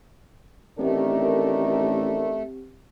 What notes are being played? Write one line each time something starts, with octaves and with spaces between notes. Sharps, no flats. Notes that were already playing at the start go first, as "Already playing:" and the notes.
A1 D#3 A3 C4 D4 G4 A#4